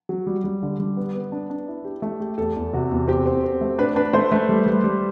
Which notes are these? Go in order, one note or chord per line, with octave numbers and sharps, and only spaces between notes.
F#3
G3
G3
D3
G3
B3
B3
D4
D4
E4
G4
A3
G4
E2 A4
E2
C3 F#4
E2
C4 G4
C4
C4
A3
D4 B4
D4 B4
A3 C5
A3 B4
G3 A4
G3
G3